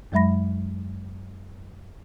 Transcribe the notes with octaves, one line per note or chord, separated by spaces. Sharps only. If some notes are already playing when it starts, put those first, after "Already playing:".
F#2 F#3 G#3 E5 B5 A#6